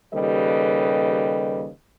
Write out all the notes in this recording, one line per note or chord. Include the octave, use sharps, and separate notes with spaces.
D#2 C#3 G3 A4 B4 D#5